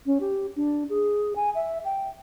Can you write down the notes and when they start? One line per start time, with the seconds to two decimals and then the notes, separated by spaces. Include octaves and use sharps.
0.06 C#4
0.21 G4
0.56 D4
0.89 G#4
1.36 G#5
1.55 E5
1.85 G5